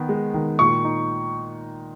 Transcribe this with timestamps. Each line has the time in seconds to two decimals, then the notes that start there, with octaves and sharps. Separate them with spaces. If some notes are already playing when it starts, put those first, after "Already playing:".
Already playing: D#3 B3
0.09 G#3
0.34 D#3
0.59 A#2 C#6
0.85 D#4